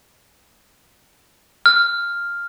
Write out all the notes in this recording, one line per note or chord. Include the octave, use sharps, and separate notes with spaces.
F6